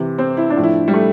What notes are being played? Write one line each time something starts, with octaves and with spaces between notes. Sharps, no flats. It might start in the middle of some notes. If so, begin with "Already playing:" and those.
Already playing: C3 E3
C4
E4
D4
A2 F3
E4
G3
A3